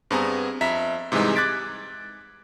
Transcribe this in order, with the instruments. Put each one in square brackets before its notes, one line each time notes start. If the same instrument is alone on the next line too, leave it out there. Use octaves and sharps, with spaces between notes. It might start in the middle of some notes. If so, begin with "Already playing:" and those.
[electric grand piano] G2 B3 C4 G#4 G#5 A#5
F2 E5 A#5 B6
G#2 C3 E3 G3 G#3 D#4
D6 F#6 G#6 A6 B6 D7